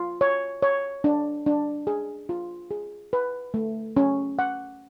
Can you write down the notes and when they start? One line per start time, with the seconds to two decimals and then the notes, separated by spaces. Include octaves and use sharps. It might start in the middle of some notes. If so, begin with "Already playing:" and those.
Already playing: F4
0.21 C#5
0.63 C#5
1.04 D4
1.46 D4
1.87 G#4
2.29 F4
2.71 G#4
3.13 B4
3.54 A3
3.97 C#4
4.39 F#5